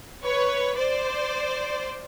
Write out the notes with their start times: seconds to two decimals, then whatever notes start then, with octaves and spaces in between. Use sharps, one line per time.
0.25 B4 C#5
0.77 C5 D5